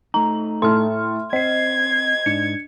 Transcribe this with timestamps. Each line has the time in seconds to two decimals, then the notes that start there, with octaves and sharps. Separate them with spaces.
0.14 A3 D#4 A#5
0.62 A2 A4 C6 F6
1.33 C4 C5 D#5 G#6 C7
2.26 G#2 D4 D#4 C#7